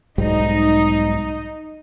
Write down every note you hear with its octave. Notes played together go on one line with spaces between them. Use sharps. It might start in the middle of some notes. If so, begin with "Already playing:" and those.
B1 G#2 G3 D#4